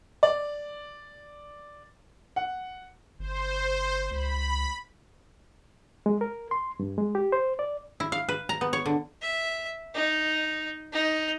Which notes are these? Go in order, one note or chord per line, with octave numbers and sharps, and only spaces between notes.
D5
F#5
G1 C5
C#2 B5
G#3
A#4
C6
G2
G#3
G4
C5
D5
E4
F5
B4
A#5
B3
C#5
D3
E5
D#4
D#4